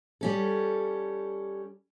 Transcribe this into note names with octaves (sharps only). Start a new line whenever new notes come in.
G3 C#4 A4